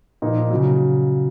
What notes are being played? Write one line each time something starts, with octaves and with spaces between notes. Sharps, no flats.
A#2 F3 D#4
C#3 F#3